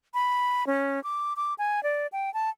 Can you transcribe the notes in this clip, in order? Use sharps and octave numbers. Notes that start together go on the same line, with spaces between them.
B5
C#4
D6
D6
G#5
D5
G5
A5